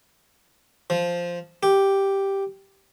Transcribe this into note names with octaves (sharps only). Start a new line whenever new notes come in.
F3
G4